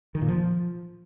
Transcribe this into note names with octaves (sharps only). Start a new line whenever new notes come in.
D#3
A#2
F3